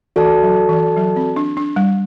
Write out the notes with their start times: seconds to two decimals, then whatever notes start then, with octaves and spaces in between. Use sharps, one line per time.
0.16 E3 F#4 A4 D5 A5
0.43 F#3
0.69 E3
0.96 F#3
1.16 C4
1.36 D4
1.57 D4
1.76 G3